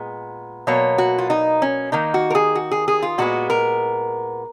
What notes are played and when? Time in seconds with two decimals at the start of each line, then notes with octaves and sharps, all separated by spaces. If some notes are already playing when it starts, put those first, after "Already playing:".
Already playing: A#2 G#3 B3
0.67 B2 F#3 A#3 C#5
0.98 F#4
1.18 F4
1.30 D#4
1.62 C#4
1.92 D#3 A#3 D#4
2.14 F#4
2.30 A#4
2.35 G#4
2.55 F#4
2.71 G#4
2.88 G#4
3.02 F4
3.18 A#2 G#3 B3 F#4
3.50 A#4